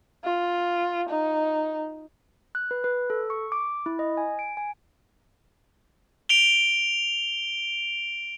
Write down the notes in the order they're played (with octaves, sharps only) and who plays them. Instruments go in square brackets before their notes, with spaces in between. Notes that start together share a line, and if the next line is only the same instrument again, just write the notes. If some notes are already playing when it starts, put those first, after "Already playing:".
[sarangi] F4
D#4
[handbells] F#6
B4
B4
A4
C#6
D6
E4
D#5
G#5
D7
G#5
[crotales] D7 F7 G7